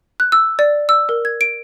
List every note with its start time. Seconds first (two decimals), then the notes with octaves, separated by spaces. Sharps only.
0.20 F#6
0.32 E6
0.59 D5
0.89 E6
1.09 A#4
1.25 G#6
1.41 D7